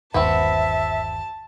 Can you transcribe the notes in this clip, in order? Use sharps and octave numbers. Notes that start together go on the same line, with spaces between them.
G1 D#2 C4 F#4 B4 E5 A5